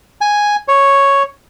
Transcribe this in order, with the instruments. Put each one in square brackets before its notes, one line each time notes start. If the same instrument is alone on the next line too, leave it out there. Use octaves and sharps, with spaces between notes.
[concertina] G#5
C#5